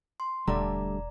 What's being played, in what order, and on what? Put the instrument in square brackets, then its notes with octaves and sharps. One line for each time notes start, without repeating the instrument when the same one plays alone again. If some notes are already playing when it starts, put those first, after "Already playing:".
[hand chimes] C6
[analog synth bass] E1 [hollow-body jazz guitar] D3 G3 A3 [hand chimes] D5 A#5